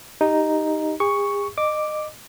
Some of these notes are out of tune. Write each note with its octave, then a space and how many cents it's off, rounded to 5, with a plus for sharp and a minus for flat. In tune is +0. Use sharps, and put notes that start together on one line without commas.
D#4 +0 G4 +0
G#4 -40 C#6 +5
D#5 -25 D6 +0